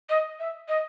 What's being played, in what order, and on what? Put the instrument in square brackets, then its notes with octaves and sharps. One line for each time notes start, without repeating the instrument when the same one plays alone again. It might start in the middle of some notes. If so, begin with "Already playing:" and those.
[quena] D#5
E5
D#5